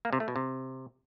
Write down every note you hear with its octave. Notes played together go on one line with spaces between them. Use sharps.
A#3
C3
A3
B2
C3